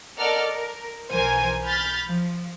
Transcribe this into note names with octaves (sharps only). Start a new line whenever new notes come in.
A4 A#4 D5 D#5 F#5 F6
A#4
B1 E3 A#4 C5 G#5 G#6
B5 F6 G6 A6 B6
F3